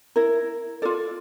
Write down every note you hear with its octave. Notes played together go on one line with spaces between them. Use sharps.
E4 A#4
F4 A4 D5